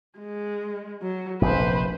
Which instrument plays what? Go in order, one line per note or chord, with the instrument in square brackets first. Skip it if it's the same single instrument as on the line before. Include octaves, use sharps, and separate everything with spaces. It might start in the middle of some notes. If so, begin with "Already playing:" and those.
[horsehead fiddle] G#3
F#3
[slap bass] F1 A#1 A#2 [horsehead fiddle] B4 C5